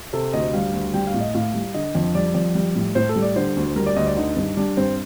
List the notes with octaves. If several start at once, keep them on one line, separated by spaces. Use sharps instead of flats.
C3 A4
D2 D#5
G3 F5
D2
G3 G5
F5
A2
D#5
A2 F5
G3
D3 D#5
F2
G3 D5
F2 D5
G3
A2
A2 C5
A4
G3
D5
D3 C5
D2
G3 A#4
D5
D2 D#5
D5
D3 D#4
G2
G3 D4
G2 C4